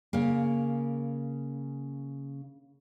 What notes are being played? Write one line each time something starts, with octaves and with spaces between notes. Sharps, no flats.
C#3 A#3